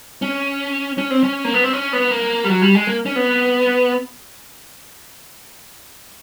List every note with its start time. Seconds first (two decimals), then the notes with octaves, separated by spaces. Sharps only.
0.22 C#4
0.98 C#4
1.10 C4
1.23 C#4
1.45 A#3
1.54 B3
1.64 C4
1.73 C#4
1.93 B3
2.11 A#3
2.44 G3
2.49 F#3
2.62 G3
2.75 G#3
2.87 A#3
3.06 C#4
3.16 B3